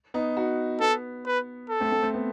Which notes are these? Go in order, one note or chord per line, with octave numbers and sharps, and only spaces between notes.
B3 D#4
D#4 F#4
B3 A4
B4
A4
A3 C4
A3 C4
A3 C4
B3